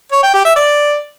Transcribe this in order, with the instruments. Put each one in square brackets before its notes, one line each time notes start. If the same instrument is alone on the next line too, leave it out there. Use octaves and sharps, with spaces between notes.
[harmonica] C#5
G5
G4
E5
D5